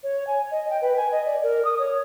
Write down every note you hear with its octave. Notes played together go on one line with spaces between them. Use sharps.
C#5
G#5
D#5
G5
B4
G#5
D#5
D5
A#4
D#6
C#5